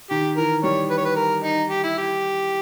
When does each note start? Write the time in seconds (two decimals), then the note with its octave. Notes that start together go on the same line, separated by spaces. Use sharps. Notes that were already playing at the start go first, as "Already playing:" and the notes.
0.10 D#3 G4
0.37 E3 A#4
0.63 G3 C#5
0.90 B4
0.98 C#5
1.05 B4
1.16 A#4
1.44 D#4
1.70 G4
1.84 E4
1.98 G4